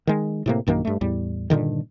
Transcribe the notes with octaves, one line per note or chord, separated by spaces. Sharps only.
D#3 G#3
A2 C3 A#3
A#1 F#2 D#3 A#3
G2 A3
E2 A2 G3
G2 A#2 D3 D#3